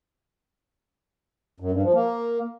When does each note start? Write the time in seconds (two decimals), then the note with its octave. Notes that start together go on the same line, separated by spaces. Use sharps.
1.60 F#2
1.71 G2
1.83 F3
1.94 A#3